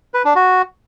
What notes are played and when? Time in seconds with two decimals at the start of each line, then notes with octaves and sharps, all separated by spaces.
0.14 B4
0.25 D4
0.36 F#4